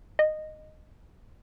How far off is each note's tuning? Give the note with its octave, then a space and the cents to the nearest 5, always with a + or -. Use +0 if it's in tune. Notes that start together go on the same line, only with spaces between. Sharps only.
D#5 -10